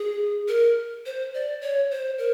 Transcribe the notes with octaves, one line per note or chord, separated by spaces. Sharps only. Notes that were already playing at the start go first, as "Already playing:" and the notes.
Already playing: G#4
A#4
C5
D5
C#5
C5
A#4